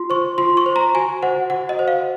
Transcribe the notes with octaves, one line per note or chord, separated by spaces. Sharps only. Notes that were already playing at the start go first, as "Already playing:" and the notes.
Already playing: F4 C6
C5 C#6
F4 C6
C#6
C5
A#5
F#4 G#5
C5 F#5
F#4 F#5
D#5
C5
F5